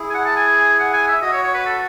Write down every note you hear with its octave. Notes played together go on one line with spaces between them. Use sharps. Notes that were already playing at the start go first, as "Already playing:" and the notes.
Already playing: E4 G#4
G#5
F#5
A5
G#5
F#5
G#5
E5
F#4 D#5
C#5
C#5
B4
A4